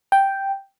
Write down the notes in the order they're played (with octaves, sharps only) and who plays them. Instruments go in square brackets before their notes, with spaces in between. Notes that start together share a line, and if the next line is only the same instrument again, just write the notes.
[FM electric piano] G5